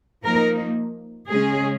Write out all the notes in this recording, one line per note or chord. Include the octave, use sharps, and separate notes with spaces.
F3 A#3 D#4 A#4
C#3 G#3 C#4 G#4